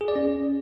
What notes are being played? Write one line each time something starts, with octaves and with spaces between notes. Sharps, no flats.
G#4
D5
C#4